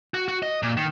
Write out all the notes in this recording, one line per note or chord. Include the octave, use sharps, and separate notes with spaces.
F#4
F#4
D#5
A#2
D#3